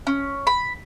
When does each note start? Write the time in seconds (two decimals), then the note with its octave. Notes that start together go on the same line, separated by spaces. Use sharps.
0.07 C#4
0.47 B5